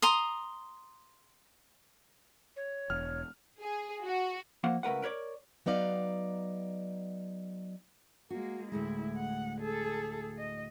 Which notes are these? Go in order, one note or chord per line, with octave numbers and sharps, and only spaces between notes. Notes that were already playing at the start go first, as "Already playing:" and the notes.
A#5 C6 D#6
C#5
E1 F6
G#4
F#4
F3 A#3 F5 F#5
C#2 A3 A#4 B4 F#5
A#4 B4 C#5 D5
F#3 B3 D#4 D5 F5
G#3 A#3 F#4
D2 A2 G#3 E4
F#5
G#4 A4
D#5